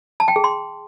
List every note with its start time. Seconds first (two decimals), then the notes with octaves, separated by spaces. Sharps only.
0.20 A5
0.28 G5
0.36 G#4
0.44 C6